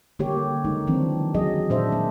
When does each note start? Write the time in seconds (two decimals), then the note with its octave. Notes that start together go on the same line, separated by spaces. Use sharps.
0.19 D3 A#3 G4 C#5
0.65 C#3 G#3 D#4
0.87 D#3 E3 F#3 C4 D4
1.34 E3 F#3 G#4 D#5
1.70 A#2 D4 C5 D#5 E5
1.92 A#3